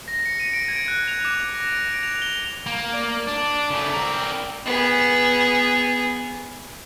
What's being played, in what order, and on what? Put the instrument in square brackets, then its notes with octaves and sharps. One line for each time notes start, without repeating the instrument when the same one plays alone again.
[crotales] A#6
C#7
D#7
D7
G#6
F#6
F7
D6
A#6
D7
F7
G7
[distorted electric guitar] A#3
[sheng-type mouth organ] D5
[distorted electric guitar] D4
C#3 A3
C4 A#4
[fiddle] B3 G#4